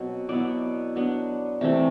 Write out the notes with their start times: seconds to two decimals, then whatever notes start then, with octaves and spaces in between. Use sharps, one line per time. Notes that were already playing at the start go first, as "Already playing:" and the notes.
Already playing: B2 F#3 C4
0.29 B2 F#3 B3 E4 D5
0.96 F#3 B3 D4
1.61 C3 E3 A3 C4